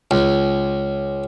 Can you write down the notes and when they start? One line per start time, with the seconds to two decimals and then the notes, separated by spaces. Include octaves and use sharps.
0.11 C#2